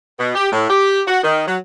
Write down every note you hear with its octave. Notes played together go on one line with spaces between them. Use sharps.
B2
G4
A2
G4
F#4
D#3
F#3